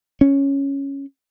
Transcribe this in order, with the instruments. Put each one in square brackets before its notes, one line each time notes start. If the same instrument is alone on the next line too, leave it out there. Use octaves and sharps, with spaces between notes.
[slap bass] C#4